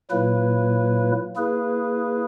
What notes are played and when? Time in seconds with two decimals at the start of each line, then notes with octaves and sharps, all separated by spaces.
0.10 A#2 F#3 A#3 E4 B4
1.36 A#3 E4 G#4 B4